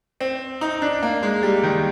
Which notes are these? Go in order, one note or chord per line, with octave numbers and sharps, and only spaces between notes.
C4
D#4
D4
A#3
G#3
G3
D#3